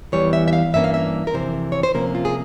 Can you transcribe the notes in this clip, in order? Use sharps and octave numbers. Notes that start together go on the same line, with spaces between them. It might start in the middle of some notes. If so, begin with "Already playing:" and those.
E2 E3 G3 C#5
E5
E5
F5
G2 E3 A#3 C#4 E5
F5
E5
A#4
F2 C3 E3 C5
C#5
C5
C3 F3 A#3 C#4 A#4
F4
G#4